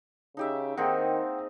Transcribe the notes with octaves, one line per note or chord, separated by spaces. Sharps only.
C#3 D#4 G4 E5
D#3 A#3 C4 D#4 G#4 F#5 G5